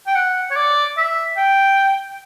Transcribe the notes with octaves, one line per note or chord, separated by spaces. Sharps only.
G5
F#5
C#5
D5
E5
G5